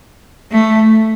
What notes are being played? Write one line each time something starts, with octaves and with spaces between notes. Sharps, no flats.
A3